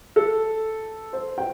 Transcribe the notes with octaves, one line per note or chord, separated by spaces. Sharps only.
A4
C5
G5